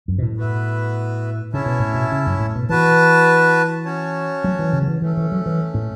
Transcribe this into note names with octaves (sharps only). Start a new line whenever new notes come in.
F#2
B2
A2
B3 F#4 B4 E5
C#3 C#4 E4 C#5 E5 A5
B2
A2
B2
C#3
F#2
A2
B2
E3 F#4 B4 A5
C#4 F#4 C#5 A5
F#3
E3
C#3
F#3
E3
E3 A3 C#4 A4
E3
F#3
E3
A2